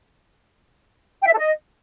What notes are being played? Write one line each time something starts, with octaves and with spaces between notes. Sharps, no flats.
G5
E5
A4
D#5